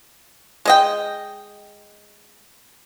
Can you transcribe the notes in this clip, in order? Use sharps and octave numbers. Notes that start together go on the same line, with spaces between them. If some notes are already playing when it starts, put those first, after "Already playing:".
G#3 D#5 G5